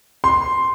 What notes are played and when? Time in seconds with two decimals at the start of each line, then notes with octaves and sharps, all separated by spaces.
0.24 C6